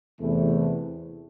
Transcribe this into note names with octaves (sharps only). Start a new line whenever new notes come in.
E2 C3 E3 A3